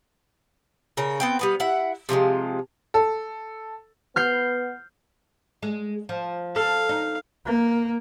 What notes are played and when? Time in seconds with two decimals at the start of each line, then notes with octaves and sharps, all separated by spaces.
0.97 C#3 A#4 C#5
1.20 B3 C4 G5
1.39 G3 B3 B4
1.60 E4 F#5
2.09 C3 F3 G3 G#3
2.94 A4
4.16 B3 F6 G6 C7
5.62 G#3
6.09 F3
6.56 A4 F5
6.89 D#4
7.46 A#3